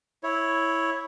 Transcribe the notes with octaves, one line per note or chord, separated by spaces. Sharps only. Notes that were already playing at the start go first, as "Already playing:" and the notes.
E4 C#5